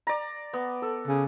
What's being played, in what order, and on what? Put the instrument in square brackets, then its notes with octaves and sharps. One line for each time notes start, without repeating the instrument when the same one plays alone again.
[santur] D5 A#5
B3
A4
[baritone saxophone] C#3